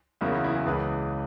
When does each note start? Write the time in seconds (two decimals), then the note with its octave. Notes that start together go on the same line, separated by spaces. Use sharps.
0.21 E2 C#3 F#3 A#3 E4
0.32 E4
0.44 E4
0.55 G#4
0.66 C#2 C#3 E3 B4